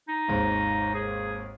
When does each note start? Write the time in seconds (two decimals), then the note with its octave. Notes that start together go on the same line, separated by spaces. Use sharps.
0.08 D#4
0.28 G#1 D#2 G#2
0.94 G#4